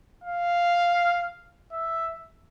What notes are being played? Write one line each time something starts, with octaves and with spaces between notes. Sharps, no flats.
F5
E5